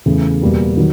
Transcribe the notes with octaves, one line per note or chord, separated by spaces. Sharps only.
E2 C#3 E3 A3
E2 B2 G3 A#3
D#3 F#3